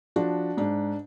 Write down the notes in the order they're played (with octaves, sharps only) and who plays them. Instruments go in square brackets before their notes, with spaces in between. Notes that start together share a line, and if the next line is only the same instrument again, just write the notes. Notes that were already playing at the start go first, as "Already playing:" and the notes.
[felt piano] F3 D4 F#4
G#2 D4